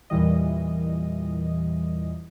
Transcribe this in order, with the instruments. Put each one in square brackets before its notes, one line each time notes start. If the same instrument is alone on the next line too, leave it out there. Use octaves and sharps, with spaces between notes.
[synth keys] E2 A#2 E3 G3 D#5